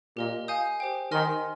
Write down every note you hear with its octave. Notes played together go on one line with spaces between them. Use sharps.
A#2 G4 A#4 D#5
F5 G#5 D#6 G6
G4 C5 G5
D#3 D#5 G#5 C6 F6